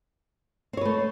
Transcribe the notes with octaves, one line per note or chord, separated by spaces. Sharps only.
A3 C4 B4 C#5